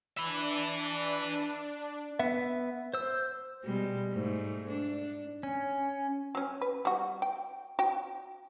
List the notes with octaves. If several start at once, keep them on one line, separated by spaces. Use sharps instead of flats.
D4 B4 E5
B3 E5
C5 E6
B2 G3 G#3
G#2 A3
D4
C#4
F#3 C#4
B4
G3 F#4
G5
F#4 G5